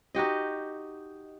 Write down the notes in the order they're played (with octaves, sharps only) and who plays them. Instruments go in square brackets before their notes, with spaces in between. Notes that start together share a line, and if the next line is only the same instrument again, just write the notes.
[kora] D#4 F#4 G4 D#5